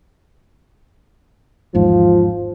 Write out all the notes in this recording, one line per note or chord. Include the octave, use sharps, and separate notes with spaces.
G#1 E2 G#2 F3